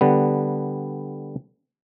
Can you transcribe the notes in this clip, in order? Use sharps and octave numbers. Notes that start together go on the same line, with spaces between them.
D3 G3 B3